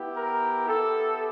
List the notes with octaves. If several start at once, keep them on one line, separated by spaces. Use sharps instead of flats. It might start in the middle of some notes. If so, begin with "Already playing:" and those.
Already playing: B3 E4 G4
A#4
B3 E4 G4 A4